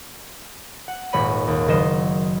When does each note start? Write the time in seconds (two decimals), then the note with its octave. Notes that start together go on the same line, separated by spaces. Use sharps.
0.88 F#5
1.12 D#1 G#1 C#5 B5 D#7
1.48 D#2
1.68 F#1 D#3 F#3 D#5 C6 E7